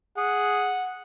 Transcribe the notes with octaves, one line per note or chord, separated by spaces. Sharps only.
G#4 F#5